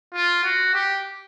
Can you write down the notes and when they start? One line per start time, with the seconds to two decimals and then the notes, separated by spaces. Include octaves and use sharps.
0.14 F4
0.44 F#4
0.74 G4